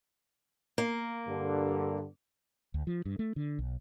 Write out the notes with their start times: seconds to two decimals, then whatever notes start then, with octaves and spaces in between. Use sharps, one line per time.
0.78 A#3
1.27 G2 D3
2.74 D2
2.87 F3
3.06 G2
3.19 A3
3.36 D3
3.59 B1